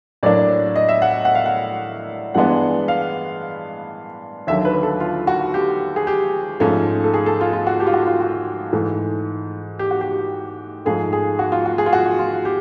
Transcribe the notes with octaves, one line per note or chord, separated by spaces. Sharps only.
A2 F#3 A#3 D4 D5
D#5
E5
F#5
F#5
F5
F#5
G2 E3 G#3 B3 D4 F#5
F5
D#2 D3 F#3 E5
B4
A4
F4
F#4
G4
G#4
G4
G#2 F3 A3 C#4
A4
G#4
A4
F4
F4
F#4
G4
F4
F#4
F4
F#4
G#2 E3 A3
G4
F#4
G4
G#2 F3 A3 G#4
G#4
F#4
F4
F#4
G#4
F4
F#4
F4
G4